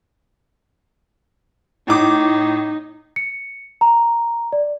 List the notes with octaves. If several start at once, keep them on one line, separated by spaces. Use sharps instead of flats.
A2 D#4 D6
C#7
A#5
D5